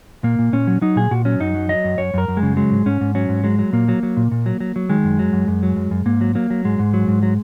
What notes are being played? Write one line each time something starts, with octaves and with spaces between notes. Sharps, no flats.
A#2 A#3
A#2
A#2 C#4
F#3
F#3 D#4
A#2 G#4
A#2 F#4
F#3 C#4
F#2 D#4
F#3
F#3 D#5
F#2
F#2 C#5
F#2 A#4
F#2
G#3
C#3
F#3 G#3
G#2
G#2 C#4
G#2
F#3 C#4
G#2
F#3 G#3
F#3
A#2 A#3
F#3
F#3
A#2
A#2
F#3
F#3
F#3
D#3 G#3
F#2
F#3
F#2
F#2
F#3
F#2
F#2
G#2 A#3
F#3
F#3 A#3
F#3
G#2 G#3
G#2
F#3
G#2
F#3